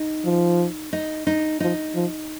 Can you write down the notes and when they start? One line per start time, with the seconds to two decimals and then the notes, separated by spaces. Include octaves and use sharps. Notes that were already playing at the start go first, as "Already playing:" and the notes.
Already playing: D#4
0.25 F3
0.93 D#4
1.27 D#4
1.60 F3 D#4
1.95 F3